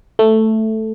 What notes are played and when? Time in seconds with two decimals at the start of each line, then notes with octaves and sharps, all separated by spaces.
0.19 A3